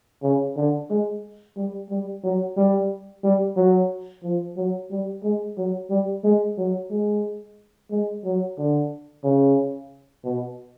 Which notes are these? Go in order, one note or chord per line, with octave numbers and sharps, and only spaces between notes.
C#3
D3
G#3
G3
G3
F#3
G3
G3
F#3
F3
F#3
G3
G#3
F#3
G3
G#3
F#3
G#3
G#3
F#3
D3
C#3
B2